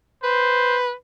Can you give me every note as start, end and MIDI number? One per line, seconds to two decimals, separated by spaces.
0.24 0.93 71
0.24 0.80 72